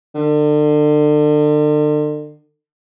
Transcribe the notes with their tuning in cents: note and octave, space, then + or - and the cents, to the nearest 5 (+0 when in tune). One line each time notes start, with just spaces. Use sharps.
D3 +35